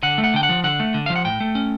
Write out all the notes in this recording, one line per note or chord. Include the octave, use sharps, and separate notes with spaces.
D3 F#5
A3
F#5
D3 G5
F#5
F3
D3 F#5
A3
D3
F3 F5
F#5
A2 G5
A3
C#4